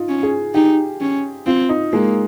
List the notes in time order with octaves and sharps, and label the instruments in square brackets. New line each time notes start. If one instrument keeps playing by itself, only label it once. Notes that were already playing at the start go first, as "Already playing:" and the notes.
Already playing: [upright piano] D#4 F4
[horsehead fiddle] C#4
[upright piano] G#4
[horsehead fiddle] D#4 [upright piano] G4
[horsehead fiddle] C#4
[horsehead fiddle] C4 [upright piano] F4
[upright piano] D#4
[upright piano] G#3 [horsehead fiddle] A#3